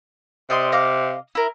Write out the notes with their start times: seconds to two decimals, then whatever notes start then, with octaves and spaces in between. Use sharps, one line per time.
0.50 C3 D5 D#5 C6
0.72 D#5 F5 D6
1.35 E4 A#4